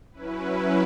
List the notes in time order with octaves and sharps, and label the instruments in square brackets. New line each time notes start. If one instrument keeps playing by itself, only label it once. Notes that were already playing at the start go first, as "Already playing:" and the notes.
[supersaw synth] F#3 C#4 E4 B4